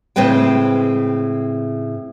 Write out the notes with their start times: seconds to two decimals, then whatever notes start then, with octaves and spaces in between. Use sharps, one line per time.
0.16 A2 C#3 G#3 C4 B4 G5